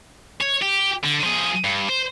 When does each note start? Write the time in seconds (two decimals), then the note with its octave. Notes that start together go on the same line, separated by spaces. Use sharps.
0.41 C#5
0.62 G4
1.04 D3
1.24 F3 G#4
1.64 G2
1.89 C5